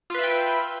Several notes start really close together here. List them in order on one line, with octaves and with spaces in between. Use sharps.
F4 B4 E5 G5